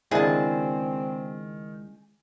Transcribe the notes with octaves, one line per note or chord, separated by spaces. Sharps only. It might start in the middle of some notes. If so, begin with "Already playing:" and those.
C#2 D#3 C4 D4 E4 G#4 A5